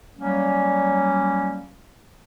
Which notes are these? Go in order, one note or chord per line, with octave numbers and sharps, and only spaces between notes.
F#3 G3 A#3 C#4